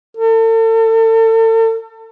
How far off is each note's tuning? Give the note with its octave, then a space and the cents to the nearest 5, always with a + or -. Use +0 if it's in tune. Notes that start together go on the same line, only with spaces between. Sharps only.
A4 +40